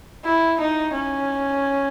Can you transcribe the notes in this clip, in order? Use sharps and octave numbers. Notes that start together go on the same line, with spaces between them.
E4
D#4
C#4